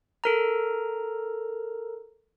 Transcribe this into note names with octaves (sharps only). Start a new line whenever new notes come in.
A4 A#4 A#5